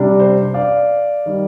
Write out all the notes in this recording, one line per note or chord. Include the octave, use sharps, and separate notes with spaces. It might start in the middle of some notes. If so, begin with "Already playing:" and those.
Already playing: C3 G3 D4
C5
D5 F5
D#3 G3